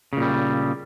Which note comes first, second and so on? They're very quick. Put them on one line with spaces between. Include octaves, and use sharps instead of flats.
C#3 A#2 G3